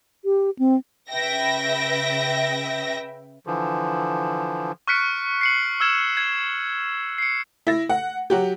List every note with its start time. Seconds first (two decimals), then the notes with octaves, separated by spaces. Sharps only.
0.25 G4
0.59 C4
1.11 C#3 B4 E5 G5 A#6
3.47 D3 E3 F3
4.87 C#6 F6 F#6 B6 C#7 D7
5.41 C7 C#7 F#7
5.80 E6 F6 G#6 E7
6.17 G#6
7.18 C7 C#7
7.67 E4 A#6
7.89 F#5
8.30 F#3 F#4 G4